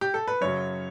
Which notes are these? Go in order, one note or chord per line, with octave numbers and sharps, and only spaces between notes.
G4
A4
B4
F#2 C#3 F#3 C#5